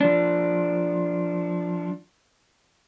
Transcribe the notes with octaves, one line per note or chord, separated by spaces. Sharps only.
F3 D4